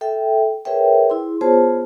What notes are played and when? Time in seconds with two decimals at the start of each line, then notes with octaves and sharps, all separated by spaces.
0.01 A4 E5 G5
0.65 G#4 A#4 B4 C#5 E5 G5
1.10 E4 G#4 C6
1.41 B3 F4 G#4 C5 C#5 A5